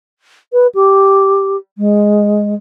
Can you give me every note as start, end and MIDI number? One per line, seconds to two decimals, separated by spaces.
0.53 0.67 71
0.74 1.57 67
1.78 2.54 56